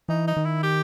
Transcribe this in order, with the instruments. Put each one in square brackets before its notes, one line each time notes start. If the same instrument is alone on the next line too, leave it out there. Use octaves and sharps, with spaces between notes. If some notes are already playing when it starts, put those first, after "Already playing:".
[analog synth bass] E3 [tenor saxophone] D#4
[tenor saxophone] D#4
[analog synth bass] D#3
[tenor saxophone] E4
G4